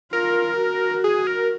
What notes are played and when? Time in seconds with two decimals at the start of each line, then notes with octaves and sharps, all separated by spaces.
0.13 F4 A#4
0.59 F#4
1.04 G#4
1.27 A#4